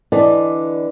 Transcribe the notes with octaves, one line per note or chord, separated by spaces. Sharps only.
D3 E3 B4 D5 D#5 A5